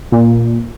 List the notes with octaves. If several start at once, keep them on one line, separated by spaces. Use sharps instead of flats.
A#2